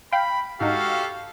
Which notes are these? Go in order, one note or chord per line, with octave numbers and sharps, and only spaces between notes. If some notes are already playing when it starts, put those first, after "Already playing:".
F5 G5 B5
G#2 D#4 F#4 G4 A4 F5